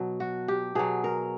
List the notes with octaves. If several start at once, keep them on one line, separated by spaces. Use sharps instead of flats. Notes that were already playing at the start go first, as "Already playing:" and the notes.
Already playing: B2 F#3
F#4
G4
B2 F#3 G#4
A#4